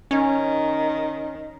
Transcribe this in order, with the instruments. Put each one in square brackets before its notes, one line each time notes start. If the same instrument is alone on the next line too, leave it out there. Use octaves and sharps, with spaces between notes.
[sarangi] D#3 [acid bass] C#4